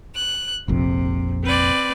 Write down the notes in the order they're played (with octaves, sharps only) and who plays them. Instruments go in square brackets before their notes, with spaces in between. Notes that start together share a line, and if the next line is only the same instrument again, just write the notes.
[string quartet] F#6
[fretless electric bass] F1 A#1 F2 [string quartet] C3
[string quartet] C4 B4 D5